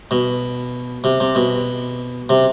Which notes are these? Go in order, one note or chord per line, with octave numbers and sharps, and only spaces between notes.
B2
C3
C3
B2
C3